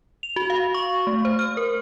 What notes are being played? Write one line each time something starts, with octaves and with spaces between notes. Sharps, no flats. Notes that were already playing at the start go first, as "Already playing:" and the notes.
F7
F#4
F5
C#6
A3
C5
F6
A#4